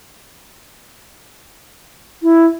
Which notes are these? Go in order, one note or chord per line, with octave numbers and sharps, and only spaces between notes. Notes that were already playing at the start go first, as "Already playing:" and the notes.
E4